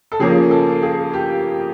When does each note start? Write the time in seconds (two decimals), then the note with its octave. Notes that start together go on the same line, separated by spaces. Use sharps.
0.12 A4
0.19 C#3 F3 A#3 C#4 G#4
0.51 A4
0.82 G#4
1.14 G4